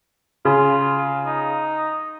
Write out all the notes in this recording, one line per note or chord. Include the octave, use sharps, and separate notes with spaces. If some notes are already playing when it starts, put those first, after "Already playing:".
C#3 F4
D#4